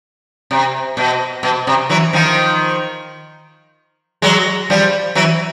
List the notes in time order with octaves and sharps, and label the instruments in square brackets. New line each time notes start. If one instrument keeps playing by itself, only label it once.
[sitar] C3
B2
B2
C3
E3 F#3
D#3 F3
F#3 G#3
F3 G3
E3 F#3